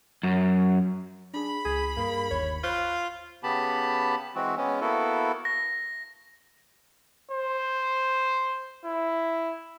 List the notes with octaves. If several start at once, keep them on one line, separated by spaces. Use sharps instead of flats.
F#2
D4 G#4 B5
C#2 G#4 B6
G2 A#3 G#4
G1 D#2 C#5
F4 C5 C#6 F#6
C#3 B3 G4 A5 B5
E3 G#3 C4 F#4
G#3 B3 C#4
A#3 B3 E4 F#4 A4
A#6
C5
E4